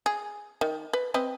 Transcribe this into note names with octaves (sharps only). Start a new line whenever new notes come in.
G#4
D#3
B4
C4 B4 D#5